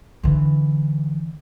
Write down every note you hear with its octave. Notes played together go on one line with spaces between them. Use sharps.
D3 E3